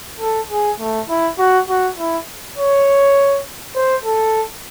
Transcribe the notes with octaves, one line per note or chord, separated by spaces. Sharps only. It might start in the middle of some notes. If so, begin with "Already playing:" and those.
A4
G#4
A3
E4
F#4
F#4
E4
C#5
C5
A4